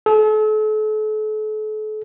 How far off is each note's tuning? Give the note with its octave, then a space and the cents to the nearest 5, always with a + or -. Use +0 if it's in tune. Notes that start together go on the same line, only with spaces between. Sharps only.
A4 -40